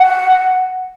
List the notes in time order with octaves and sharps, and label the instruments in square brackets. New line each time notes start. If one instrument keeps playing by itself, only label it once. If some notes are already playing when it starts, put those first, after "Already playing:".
Already playing: [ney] F#5